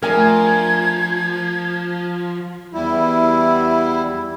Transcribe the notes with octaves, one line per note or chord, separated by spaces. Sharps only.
F3 A3 D4 A#4 G#5 G#6
E2 G3 E4